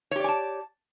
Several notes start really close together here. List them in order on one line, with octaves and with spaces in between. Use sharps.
C#5 G4 D5 G#5 A5